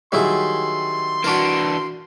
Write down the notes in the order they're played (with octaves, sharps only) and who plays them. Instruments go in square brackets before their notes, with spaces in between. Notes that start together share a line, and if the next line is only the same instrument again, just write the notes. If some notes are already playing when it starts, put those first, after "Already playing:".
[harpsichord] D#3 F#3 E4 [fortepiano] G3 G#4 [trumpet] C6
[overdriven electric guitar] E3 D4 [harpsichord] F#4 A#4